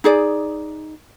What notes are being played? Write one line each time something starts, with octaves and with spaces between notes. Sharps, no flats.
D#4 G#4 D5